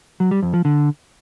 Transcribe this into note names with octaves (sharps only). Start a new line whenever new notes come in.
F#3
G3
F2
F3
D3